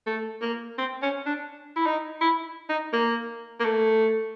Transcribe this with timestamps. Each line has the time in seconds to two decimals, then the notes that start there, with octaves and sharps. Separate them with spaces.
0.06 A3
0.42 A#3
0.78 C4
1.02 C#4
1.26 D4
1.76 E4
1.86 D#4
2.21 E4
2.69 D#4
2.93 A#3
3.60 A#3
3.65 A3